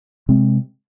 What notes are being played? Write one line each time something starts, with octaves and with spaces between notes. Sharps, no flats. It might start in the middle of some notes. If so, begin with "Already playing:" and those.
C3 G#3 C4